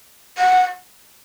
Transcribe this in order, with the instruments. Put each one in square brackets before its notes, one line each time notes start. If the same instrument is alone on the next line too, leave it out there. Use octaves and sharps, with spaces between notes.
[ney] F#5